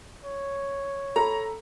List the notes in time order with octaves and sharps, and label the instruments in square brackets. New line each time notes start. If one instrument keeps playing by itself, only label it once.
[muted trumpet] C#5
[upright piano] A4 B5 [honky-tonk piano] A#5